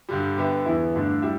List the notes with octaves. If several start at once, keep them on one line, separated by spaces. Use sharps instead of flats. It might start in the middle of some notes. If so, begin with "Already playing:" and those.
G2 D3 G3
D3 B3 G4 E5
E2 E3 B3 E4
G2 D3 A3 D4
G3 E4 G4 E5